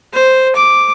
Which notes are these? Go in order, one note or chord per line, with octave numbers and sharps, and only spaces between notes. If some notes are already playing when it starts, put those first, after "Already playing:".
C5
D6